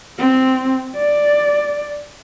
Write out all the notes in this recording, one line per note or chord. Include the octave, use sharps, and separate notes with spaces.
C4
D5